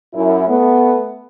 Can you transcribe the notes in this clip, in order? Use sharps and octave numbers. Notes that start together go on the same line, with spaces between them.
F#2 E4
A3 B3